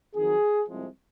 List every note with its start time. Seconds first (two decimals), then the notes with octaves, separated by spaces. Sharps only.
0.15 F2 D#3 F#3 G#4
0.68 C2 C3 F3 G#3